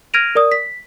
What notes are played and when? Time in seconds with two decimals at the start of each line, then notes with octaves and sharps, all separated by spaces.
0.14 F6 G#6 A#6 D7 D#7 F7
0.35 A#4 D5 D#6
0.52 B6